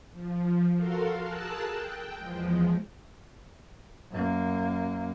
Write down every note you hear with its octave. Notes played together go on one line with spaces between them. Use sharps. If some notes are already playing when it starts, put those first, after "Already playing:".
F3
F#4 A4 A#4 F5 C6
G#4 A#4 A5 E6 F#6
G5
E2 F3 G#3
F#2 A#3